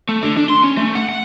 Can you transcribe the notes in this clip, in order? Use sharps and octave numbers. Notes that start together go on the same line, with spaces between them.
A3
D3
D4
C6
C#4
A3
F#5
F#5